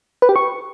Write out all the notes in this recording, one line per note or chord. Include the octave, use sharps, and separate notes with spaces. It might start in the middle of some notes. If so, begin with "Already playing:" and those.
B4
G4
C#6